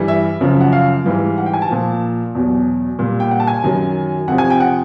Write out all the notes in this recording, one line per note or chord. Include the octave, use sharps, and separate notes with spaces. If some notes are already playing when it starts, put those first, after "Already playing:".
Already playing: G2 E3 G3
E5
F#2 C#3 F3
F#5
F5
G#2 E3 G3
F#5
G5
G#5
A5
A#2 F3
E2 B2 F#3
A#2 G3
G5
F#5
A5
G#5
F#2 D#3 F#3
F2 C3 F3 F#5
G#5
G5
F#5